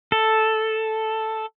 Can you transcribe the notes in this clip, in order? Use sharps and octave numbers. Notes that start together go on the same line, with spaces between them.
A4